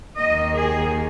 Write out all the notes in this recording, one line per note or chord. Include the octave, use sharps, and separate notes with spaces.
D#2 D#3 A#3 D#5
G#4